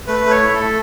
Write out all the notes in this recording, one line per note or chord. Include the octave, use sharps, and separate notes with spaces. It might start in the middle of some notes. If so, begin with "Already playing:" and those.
A3 B4
A3
C#5
E4
A3 A4